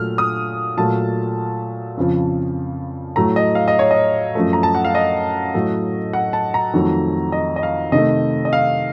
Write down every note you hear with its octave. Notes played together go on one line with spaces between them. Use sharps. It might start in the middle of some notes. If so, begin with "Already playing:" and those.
Already playing: A#2 F#3 A3 F6
D#6
A#2 F#3 A3 A5
F2 C#3 F3
A2 F#3 A3 A#5
D#5
F5
D#5
C#5
D#5
F#2 F3 A3
A#5
A5
F#5
F5
D#5
A2 F#3 A3
F#5
A5
A#5
F2 D#3 F#3 A3
D#5
D#5
F5
C3 D#3 A3 D#5
D#5
F5